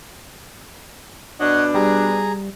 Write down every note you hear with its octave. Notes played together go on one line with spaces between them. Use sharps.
B2 D4 C#5 D#5 F#5
G3 G#4 A#5